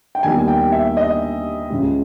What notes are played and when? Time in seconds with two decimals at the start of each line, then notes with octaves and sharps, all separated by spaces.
0.15 G5
0.23 D#2 D#3 G3 B3 G#5
0.48 G5
0.72 E5
0.97 D#5
1.70 C#2 C#3 G#3